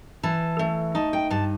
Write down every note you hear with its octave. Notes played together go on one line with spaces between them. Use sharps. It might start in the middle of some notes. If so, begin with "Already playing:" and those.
E3 A5
A3
D#4 A5
G5
G2 A5